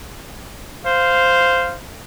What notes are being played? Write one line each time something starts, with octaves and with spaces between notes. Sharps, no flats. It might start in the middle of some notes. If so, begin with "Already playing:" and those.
C5 F5